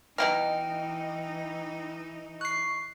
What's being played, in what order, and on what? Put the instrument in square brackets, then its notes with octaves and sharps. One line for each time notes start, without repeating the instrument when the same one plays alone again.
[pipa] B2 E4 A#5 [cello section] E3 D#4 [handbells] G5 F6
[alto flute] C#6 [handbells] F#6 C7